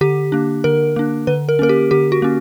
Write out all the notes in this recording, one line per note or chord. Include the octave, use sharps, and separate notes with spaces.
D3 G4
A#3 D4
D3 A#4
A#3 D4
D3 B4
A#4
A#3 C#4 A#4
G4
D3 G4
F#4
A#3 C#4